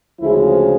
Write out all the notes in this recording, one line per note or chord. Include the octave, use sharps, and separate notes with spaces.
D2 C#3 F3 G#3 E4